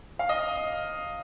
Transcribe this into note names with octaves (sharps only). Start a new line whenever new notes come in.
F5
D#5